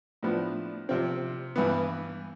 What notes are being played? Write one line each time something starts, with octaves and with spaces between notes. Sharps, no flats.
A2 F3 B3 D4
C3 F3 C4
G2 E3 B3